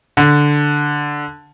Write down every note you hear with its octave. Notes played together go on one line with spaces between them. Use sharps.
D3